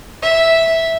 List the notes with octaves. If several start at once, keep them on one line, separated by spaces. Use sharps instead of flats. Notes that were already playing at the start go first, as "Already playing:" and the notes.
E5